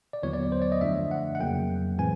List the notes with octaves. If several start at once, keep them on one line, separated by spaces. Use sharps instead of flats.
D5
D#2 D3 F#3 B3 E4 C#5
D5
C#5
C5
D5
D#5
F#2 D3 F3 A3 D4 E5
F#5
F#5
F2 C#3 F#3 A#3 G5
A2 E3 G#3 C4 G#5